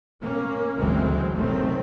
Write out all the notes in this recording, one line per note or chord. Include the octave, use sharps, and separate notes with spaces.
A#3 C#4
F#1 D2 E3 F#3 G#3 C4
F#1 F#2 C3 D#3 A3 C4